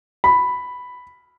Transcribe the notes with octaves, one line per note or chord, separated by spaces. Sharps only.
B5